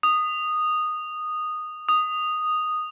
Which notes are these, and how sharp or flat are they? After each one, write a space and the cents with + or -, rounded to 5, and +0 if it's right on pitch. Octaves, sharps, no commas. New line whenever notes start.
D#6 -10
D#6 -5